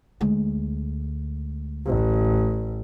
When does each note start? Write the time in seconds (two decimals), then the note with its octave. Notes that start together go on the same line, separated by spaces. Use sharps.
0.21 D2 G#3
1.87 A1